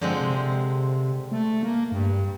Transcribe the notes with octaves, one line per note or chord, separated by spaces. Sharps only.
D3 F3 G#3 C4
C3
A3
A#3
G2